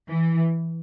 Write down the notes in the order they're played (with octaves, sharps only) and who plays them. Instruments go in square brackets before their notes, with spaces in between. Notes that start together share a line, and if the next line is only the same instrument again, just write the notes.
[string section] E3